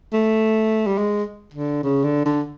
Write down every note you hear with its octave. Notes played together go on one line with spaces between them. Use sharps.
A3
G3
G#3
D3
C#3
D3
D3